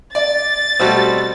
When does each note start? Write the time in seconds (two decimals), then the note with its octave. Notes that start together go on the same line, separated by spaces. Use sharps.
0.15 D5 A6
0.80 B2 G3 A3 C4 F#4